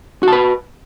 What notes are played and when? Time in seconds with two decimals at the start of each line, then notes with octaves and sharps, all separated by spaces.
0.23 F#4
0.28 A5
0.32 B4